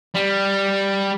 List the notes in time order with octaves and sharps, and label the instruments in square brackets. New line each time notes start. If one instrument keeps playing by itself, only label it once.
[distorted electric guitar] G3